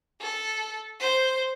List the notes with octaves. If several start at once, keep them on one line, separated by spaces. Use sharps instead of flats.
A4
C5